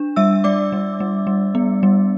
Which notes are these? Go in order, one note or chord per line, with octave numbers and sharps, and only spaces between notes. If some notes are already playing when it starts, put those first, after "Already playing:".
Already playing: D4
G3 E5 E6
G3 D5 D6
G3
G3
G3
B3
G3